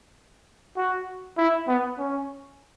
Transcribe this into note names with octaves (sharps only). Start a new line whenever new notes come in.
F#4
E4
B3
C#4